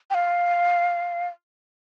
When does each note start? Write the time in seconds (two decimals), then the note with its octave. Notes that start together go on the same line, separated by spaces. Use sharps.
0.10 G5
0.14 F5